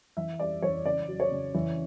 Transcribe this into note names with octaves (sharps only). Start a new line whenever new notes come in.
E3 E5
G3 D5
E3 C#5
C#3 D5
F#3
C#5
C#3
E3